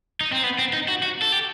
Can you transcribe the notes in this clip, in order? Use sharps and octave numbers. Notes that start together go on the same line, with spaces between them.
D#4
C4
B3
C4
D#4
F#4
F#4
A4
G4